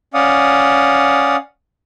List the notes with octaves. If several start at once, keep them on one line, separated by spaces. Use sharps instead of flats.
C#4 D5 F5 F#5 D#6